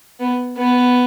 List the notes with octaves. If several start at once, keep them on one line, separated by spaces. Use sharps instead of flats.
B3
B3